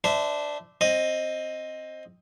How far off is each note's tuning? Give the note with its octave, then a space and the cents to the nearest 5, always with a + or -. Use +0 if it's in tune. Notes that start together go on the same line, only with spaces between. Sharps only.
D4 +0 C5 -30 E5 -10
C4 +15 D#5 +0